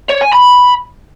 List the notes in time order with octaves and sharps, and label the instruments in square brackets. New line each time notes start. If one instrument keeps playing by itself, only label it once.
[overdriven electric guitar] C#5
G#5
B5